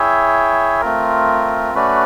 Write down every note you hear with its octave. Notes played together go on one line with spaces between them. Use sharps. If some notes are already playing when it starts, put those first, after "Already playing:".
Already playing: E4 G#4 C#5 E5 G5
A3 C4 F4 A#4
A3 C#4 F#4 B4 D5